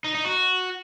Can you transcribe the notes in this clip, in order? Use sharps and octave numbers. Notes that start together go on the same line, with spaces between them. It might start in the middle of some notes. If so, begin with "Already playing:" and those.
D#4
D#4
F#4